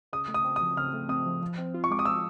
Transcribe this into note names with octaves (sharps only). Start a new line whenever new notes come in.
C#3 D#6
A3
D#6
C4
D#6
F3
C#3 F6
A3
C4 D#6
F3
F3
C4
F4
C#6
G#3 D6
D#6
F3 E6